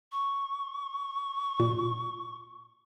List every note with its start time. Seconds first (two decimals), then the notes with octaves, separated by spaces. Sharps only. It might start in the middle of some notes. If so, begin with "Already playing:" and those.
0.12 C#6
1.60 A#2